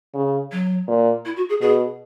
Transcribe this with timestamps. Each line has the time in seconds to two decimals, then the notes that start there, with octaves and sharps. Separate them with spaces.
0.15 C#3
0.52 F#3
0.88 A#2
1.25 E4
1.37 F#4
1.49 G#4
1.61 B2 G#4